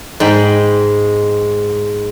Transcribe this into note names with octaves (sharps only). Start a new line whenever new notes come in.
G#2 G#3 G5 B5